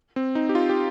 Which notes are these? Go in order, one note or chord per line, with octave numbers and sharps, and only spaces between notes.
C4
D#4
G4
F4
G4